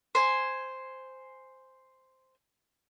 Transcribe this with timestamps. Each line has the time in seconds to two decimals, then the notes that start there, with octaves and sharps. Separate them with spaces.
0.15 C5 G#5